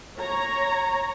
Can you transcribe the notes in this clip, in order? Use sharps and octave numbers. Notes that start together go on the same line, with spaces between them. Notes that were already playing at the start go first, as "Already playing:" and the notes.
C#5 A#5